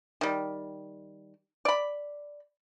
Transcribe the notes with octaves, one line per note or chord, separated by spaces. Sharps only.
D#3 G3
D5 B5